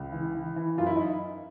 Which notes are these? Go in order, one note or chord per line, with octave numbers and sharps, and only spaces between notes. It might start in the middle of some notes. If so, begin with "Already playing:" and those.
Already playing: C#2
E3
E3
E3
F#2 F4
E4
D#4